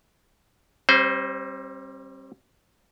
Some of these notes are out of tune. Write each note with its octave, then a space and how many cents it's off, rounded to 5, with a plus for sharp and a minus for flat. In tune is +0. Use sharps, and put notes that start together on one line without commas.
G3 +0 C4 +40 C5 -15